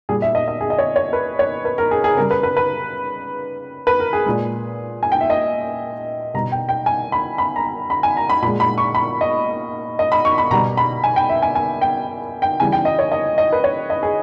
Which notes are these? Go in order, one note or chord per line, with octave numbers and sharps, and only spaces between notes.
A#2 G3 G#4
E5
D#5
D#5
G#4
D#5
C#5
C#5
B4
C#5
B4
A#4
G#4
G#4
C#3 G3 A#4
B4
B4
B4
B4
A#4
G#4
A#2 G#3
G#5
G5
E5
D#5
B2 G3 A#5
G5
G5
G#5
B5
B5
A#5
B5
G#5
A#5
B5
A#2 G#3 B5
B5
C#6
B5
D#5
D#5
B5
C#6
B5
B2 G3 A#5
B5
G#5
G5
E5
G#5
G#5
G5
G5
C#3 E3 G3 G#5
G5
D#5
C#5
D#5
D#5
B4
C#5
D#5
G#4